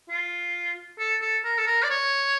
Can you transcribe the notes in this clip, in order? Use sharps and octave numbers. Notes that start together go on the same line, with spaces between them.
F4
A4
A4
A#4
A4
A#4
D5
C#5